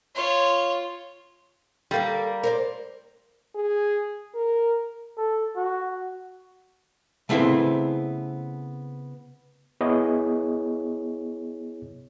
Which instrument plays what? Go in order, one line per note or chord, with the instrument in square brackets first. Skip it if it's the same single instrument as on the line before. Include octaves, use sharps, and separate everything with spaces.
[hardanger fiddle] F4 C#5
[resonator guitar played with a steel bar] G3 A#3 [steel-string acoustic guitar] A4 A#4
[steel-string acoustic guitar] A#4 C5 D5
[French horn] G#4
A#4
[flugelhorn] A4
F#4
[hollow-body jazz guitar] C#3 A3 B3 C4 E4 C5
[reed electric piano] B3 E4 G#4 C#5 D#5